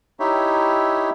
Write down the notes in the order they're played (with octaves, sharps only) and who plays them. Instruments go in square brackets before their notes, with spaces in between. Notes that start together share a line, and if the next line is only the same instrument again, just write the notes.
[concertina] D#4 E4 G4 C#5 E5